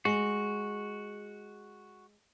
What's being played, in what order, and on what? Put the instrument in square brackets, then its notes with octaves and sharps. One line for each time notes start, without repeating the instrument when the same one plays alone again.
[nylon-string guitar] G#3 [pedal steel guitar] F#4